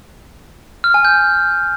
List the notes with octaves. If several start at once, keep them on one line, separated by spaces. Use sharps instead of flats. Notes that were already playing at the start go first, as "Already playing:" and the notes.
F6
G#5
G6